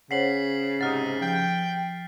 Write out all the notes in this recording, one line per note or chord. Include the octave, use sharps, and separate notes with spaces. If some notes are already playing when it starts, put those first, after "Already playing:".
C#3 C5 C#5 F#5 B6 C7 F#7
G#2 C3 D#4 F#5 F6 A6
F3 G5